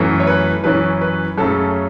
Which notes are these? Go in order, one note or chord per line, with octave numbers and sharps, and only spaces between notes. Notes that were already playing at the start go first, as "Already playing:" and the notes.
Already playing: F#2 E3 A3 C#4
C#5
B4
F#2 E3 C#4 B4
B4
F#2 C#3 A3 C#4 A4